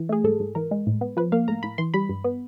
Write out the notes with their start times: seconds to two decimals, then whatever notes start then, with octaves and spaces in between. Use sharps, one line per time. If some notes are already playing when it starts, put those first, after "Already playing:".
Already playing: E3
0.09 A3 G#4
0.24 G#2 A4
0.40 G#2
0.55 E3 A#4
0.71 G#3
0.87 A2
1.01 B3
1.17 F3 B4
1.32 A#3 F5
1.48 A2 A#5
1.63 A2 B5
1.78 E3 C6
1.94 G3 B5
2.09 G2
2.24 B3